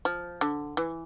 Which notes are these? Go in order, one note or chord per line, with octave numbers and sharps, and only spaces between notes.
F3
D3
E3